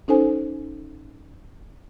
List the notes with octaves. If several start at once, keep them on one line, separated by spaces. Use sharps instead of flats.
C#4 D#4 A4 C5 G#5